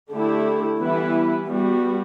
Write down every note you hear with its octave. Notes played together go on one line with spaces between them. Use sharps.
D3 A3 E4 G4
E3 G3 B3 E4 B4
G3 B3 F#4